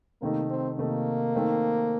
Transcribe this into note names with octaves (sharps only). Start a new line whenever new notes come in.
C3 D#3 A3 A#3 D#4
C4
C3 D#3 A3 A#3 D#4
D#3 A3 C4 D#4